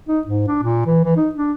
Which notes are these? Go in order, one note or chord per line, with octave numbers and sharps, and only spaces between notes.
D#4
G#2
D4
A#2
E3
E3
D#4
D4